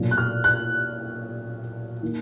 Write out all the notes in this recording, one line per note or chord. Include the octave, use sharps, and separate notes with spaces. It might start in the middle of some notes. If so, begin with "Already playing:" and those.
Already playing: B1 A#2 F#3
F#6
F6
F#6
D#3 A#3 D#4